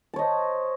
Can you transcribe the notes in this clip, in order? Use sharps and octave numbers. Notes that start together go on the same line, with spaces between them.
C5 C#5 D#5 A5